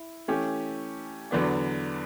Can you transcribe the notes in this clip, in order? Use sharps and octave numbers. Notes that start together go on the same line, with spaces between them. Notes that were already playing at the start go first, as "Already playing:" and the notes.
Already playing: E4
E3 A3 C#4 G4
E2 D3 F#3 B3 D4